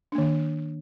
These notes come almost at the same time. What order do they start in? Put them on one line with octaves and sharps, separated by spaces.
D4 A#3 D#3